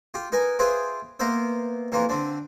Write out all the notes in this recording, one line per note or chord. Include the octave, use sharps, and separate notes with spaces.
F4 G4
D#4 A#4 B4 G#5
F4 G4 G#4 B4 C5 E5
A#3 B3 A#4 C5 E5
F2 E3 A#3 F4
D3 C4 D4